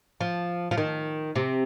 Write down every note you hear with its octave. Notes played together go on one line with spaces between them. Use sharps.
F3
F3
D#3
C3